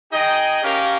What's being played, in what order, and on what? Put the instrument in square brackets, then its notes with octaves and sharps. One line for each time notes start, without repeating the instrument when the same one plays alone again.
[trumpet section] D#4 G#4 D#5 G5
C#4 G4 A#4 F5